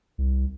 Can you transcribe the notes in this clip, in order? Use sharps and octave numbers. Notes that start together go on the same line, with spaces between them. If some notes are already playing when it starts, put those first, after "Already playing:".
C2